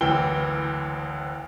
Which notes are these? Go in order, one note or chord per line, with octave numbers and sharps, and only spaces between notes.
F#1 D2 E3 G5 G7